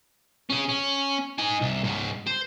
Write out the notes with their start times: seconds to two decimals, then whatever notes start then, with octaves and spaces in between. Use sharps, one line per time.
0.50 C#4 G#4
0.69 C#4
1.38 D#4 G#5
1.61 C2
1.84 G#2 C#3
2.27 C5